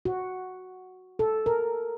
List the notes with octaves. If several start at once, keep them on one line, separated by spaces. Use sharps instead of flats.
F#4
A4
A#4